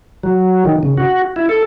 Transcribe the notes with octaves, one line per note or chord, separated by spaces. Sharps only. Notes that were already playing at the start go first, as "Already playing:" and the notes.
F#3
D#3
C#3
F#4
E4
A4